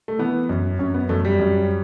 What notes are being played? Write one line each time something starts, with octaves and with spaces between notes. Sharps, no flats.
A3
E3 B3
F#2
F#2 C#4
B3
F#2 A3
G3
F#2